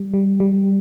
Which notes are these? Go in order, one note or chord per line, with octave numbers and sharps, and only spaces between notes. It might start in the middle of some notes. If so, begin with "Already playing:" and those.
Already playing: G3
G3
G3